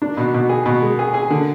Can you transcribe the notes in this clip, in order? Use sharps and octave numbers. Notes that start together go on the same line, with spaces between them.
D4
B2
B2
G#4
B2
G#3
G#4
G#4
D3